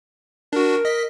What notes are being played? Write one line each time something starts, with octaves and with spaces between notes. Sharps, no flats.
D4 F#4 A#4
D#5 B6